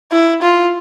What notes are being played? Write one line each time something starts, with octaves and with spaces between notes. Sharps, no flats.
E4
F4